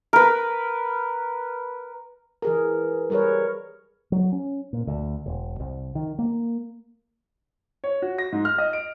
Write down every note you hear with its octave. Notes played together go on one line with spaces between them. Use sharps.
A#4 B4
E3 G#4 A#4
G3 G#4 A#4 B4 C#5
F#3
C#4
A#2
D2
E1
C2
D#3
A#3
C#5
F#4
A#6
G#2
F6
D#5
D7